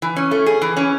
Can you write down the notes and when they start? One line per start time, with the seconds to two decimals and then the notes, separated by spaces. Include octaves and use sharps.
0.02 E3
0.16 C#4
0.31 A3
0.46 G#4
0.62 E3
0.77 C#4